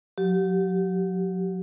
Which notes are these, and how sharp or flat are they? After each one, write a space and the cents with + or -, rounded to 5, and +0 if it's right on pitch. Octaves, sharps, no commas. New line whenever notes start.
F#3 -35 G4 -30